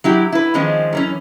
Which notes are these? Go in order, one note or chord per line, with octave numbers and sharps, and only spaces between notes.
F#3 E4 G4
E4 B4
D#3 F3 G#3 C4 C#4
F#2 E3 C#4